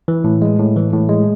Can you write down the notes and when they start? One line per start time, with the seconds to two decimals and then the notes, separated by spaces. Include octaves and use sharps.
0.08 E3
0.24 A2
0.42 G#3
0.59 A2
0.76 E3
0.93 A2
1.09 G#3